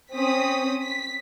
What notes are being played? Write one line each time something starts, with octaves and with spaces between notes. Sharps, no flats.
C4 C#4 D#6 B6
B6